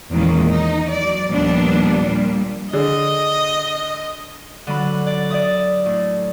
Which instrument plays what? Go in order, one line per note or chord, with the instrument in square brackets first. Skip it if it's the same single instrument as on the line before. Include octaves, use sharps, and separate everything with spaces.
[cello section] E2 A#2 D#3 G#3 A#3 C#4
D#4
F#3 D5
D#2 A#2 F3 G3 B3 D4
A#2 G3 A#3
[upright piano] D3 G#4 D5 [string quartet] D#5
[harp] D3 F#3 B5
D5
D5 E5 D#6
A2